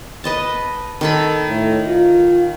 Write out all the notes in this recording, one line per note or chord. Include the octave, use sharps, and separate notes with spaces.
B4 D#5 A5
D#3 A4 B5
A2
F4